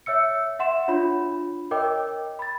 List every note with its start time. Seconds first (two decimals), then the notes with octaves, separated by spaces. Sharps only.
0.06 C#5 E5 E6 C#7
0.59 E5 F#5 C6 E7
0.88 D4 F4 C#5 B5
1.71 A#4 C#5 D#5 G5 D6
2.39 B5 A6